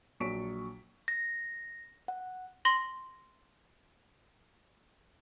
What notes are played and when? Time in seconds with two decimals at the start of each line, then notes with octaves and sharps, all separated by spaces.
0.20 A#1 F#3 C#6 B6 D7
1.08 A#6
2.08 F#5
2.65 C6 A#6 F#7